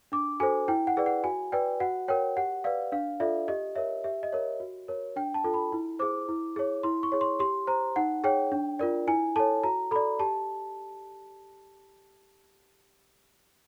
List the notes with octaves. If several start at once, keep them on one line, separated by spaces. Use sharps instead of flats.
D4 D6
F#4 A4 C5 G#5
E4 G5
F#5
G#4 B4 D5
F#5
F#4 G#5
B4 D5 G5
F#4 F#5
A#4 C#5 G5
G4 F#5
B4 D5 F5
D4 F5
F4 A4 D5 E5
G4 D#5
A#4 C#5 E5
G4 E5
D#5
A#4 C#5
F#4
A#4 C#5
D4 G5
A5
F4 A4
B5
E4
G#4 C5 D6
E4
G#4 C#5
E4 C6
C#6
G#4 C#5
C6
G4 C6
C5 A#5
D#4 F#5
G#4 C#5 G5
D4
F4 A#4 D5
E4 G#5
A4 C#5 A5
F#4 A#5
A4 D5 B5
G4 A5